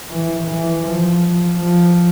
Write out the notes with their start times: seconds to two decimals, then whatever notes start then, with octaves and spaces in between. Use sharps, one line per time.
0.10 E3
0.47 E3
0.82 F3
1.55 F3